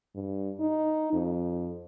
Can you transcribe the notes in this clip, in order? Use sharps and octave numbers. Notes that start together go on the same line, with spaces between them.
G2
D#4
F2